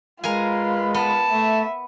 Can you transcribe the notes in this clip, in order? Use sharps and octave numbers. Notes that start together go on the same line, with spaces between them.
G#3 F4 A#4 B4 F5 G#5
B3 A5
A3 E5